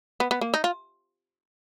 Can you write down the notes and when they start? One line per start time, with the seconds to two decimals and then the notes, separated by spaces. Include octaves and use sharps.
0.20 B3
0.31 B3
0.41 A#3
0.54 D#4
0.64 F4